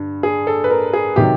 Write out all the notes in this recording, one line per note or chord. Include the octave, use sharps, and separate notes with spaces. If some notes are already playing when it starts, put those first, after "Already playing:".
Already playing: G2 D3
G#4
A4
B4
A#4
G#4
C3 D#3 F#3 G4